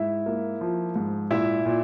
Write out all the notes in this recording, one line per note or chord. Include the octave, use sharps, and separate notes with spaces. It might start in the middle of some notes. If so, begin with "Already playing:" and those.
Already playing: G#2 E4 E5
A#3
F3
G#2
A#2 E4 E5
A#2